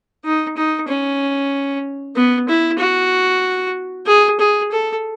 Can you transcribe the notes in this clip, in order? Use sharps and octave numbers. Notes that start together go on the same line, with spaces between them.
D#4
D#4
C#4
B3
E4
F#4
G#4
G#4
A4